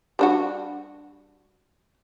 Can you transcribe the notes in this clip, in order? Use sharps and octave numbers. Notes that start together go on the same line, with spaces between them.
G3 D4 F#4